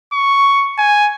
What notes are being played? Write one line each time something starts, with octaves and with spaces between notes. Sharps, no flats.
C#6
G#5